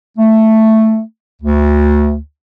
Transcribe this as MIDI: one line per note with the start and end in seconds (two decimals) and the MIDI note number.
0.17 1.01 57
1.42 2.17 38